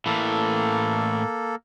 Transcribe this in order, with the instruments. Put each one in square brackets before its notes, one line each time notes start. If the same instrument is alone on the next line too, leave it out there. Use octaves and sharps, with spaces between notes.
[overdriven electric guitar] A2 E3 [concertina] A#3 A4